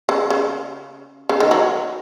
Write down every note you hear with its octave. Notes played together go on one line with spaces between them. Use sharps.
C#3
C#3
C#3
D#3
F#3